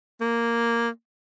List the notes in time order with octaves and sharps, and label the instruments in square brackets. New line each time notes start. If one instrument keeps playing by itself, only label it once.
[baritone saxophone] A#3